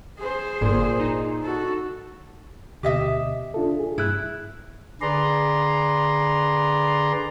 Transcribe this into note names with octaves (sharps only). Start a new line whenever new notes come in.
G#4 C5
G1 A#2
D#4
F#4 A4
D2 B2 G4 D#5 E5
D4 F4 A4
G#4
G2 E4 F#6
D3 G#4 B4 D5 A#5 C6